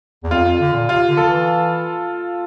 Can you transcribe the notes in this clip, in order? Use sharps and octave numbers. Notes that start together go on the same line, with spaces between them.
E2
F2 F4
F2
D3
A#2
C3 F4
D3
A4
E3